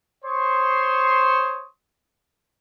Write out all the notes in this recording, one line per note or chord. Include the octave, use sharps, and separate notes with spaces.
C5 C#5 C6 C#6 D#6